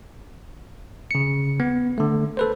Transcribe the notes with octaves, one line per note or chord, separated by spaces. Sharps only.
C#3 C#7
B3
D3 A3
A4 B4 C5